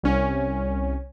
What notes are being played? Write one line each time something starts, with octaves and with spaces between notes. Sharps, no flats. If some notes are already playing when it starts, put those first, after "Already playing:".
C2 C#4